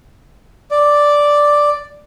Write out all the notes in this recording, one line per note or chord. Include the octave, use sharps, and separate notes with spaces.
D5